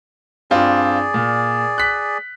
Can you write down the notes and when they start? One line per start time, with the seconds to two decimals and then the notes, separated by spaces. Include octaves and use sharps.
0.51 G2 C4 F4 G#4 D5
1.14 A#2
1.78 F#6 B6